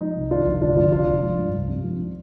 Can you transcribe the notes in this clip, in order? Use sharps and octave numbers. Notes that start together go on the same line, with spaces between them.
F3 D#4
C2
D#3 D4 F4
F1
G1 D4 F4
F2 D4 F4
F1 D4 F4
F1
F3
G2
C2
C3
F3
F3